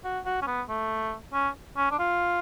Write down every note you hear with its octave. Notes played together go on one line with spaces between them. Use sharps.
F#4
F#4
C#4
B3
A3
C#4
C#4
D4
F4